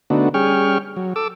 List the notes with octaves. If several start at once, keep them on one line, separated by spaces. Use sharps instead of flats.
D3 A3 B3 D4 D#4 F#4
G3 C#4 G#4 G5 C#6 F6
F#3
A4 D6 E6